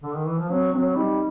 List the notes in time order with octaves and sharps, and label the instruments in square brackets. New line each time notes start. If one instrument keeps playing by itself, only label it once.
[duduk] D3
D#3
E3
F3
[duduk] F#3 [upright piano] C4
[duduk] F#3 [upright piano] C4
[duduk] G3 [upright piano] D#4